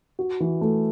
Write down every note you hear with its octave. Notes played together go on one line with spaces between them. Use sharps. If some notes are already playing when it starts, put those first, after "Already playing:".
F#4
E3
A3